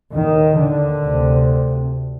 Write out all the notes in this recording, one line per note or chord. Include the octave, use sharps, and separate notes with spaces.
D#2 D#3
D3
D2 C3